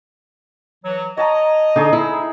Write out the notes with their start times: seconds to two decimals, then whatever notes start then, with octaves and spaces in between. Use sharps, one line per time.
0.85 E3 F#3
1.17 C#5 D#5 A5 A#5
1.76 D3 D#4 G#4 C#6
1.93 E4